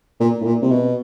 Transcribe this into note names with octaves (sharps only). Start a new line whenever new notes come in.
A#2
A2
A#2
C3
B2